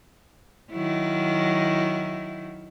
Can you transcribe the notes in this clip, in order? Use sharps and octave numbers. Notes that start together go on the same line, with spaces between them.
D#3 F#3 E4